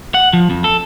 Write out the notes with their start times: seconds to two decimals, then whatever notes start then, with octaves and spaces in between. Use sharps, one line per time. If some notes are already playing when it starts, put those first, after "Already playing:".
0.14 F#5
0.33 F3
0.50 F2
0.64 A4